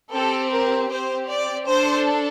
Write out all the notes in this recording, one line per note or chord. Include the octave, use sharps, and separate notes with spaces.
C4 G4 A4
A#4
C4 G4 C5
D5
D4 A4 C5